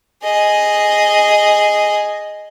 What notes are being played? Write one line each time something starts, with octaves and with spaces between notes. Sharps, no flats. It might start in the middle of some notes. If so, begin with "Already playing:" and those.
G#4 D#5